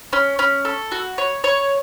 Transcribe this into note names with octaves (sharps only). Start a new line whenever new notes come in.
C#4
C#4
A4
F#4
C#5
C#5